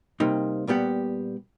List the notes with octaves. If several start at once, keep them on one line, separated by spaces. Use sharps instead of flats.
C3 G3 A#3 C4 D#4
A#2 G3 B3 G4 F#5